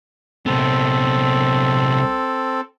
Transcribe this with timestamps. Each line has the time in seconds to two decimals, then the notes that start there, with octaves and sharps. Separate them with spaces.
0.46 C2 B3 C4 A4